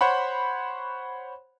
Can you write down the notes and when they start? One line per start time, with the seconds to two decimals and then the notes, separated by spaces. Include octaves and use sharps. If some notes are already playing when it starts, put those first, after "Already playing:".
0.01 C5 C#5 F#5 B5